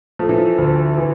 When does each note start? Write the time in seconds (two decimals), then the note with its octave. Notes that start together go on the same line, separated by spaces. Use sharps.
0.19 F3 A3
0.29 E3
0.38 F3
0.58 D2
0.98 E3